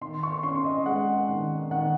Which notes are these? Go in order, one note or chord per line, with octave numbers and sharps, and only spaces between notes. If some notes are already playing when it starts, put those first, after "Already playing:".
D#3 C6
C#6
C#4 C6
D#5
G#3 F#5
D#3
D#3 F#5